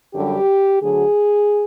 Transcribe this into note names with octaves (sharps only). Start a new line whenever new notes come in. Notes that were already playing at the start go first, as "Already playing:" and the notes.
F#2 D3 G3 G4
D2 D3 F#3 G#4